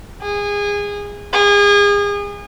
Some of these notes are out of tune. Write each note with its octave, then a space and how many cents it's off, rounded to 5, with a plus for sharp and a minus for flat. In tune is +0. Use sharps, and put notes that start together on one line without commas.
G#4 -25
G#4 -35